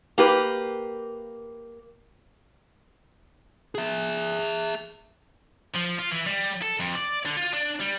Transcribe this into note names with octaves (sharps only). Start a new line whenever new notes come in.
A#3 G4 B4
G#4 E5
F3
F4
E3
G3
A4
F2
D5
D3
F4
D4
G3